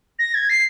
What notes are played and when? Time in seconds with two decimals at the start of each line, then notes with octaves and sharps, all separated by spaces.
0.19 A#6
0.34 G#6
0.49 C7